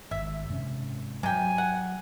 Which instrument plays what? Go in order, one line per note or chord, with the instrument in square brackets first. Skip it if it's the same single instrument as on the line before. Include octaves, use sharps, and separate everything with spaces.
[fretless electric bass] G#1 [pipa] E5
[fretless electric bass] G#2 C3 C#4
[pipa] C3 G5 [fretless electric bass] F#3 [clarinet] G#5
[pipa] F#5